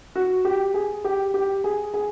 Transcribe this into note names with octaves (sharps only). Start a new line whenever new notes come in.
F#4
G4
G#4
G4
G4
G#4
G#4